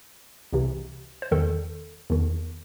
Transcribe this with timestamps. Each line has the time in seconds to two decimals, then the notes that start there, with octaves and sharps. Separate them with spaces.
0.53 C2 C3 E3
1.22 C5
1.31 E2 D#3 A4
2.10 E2 D#3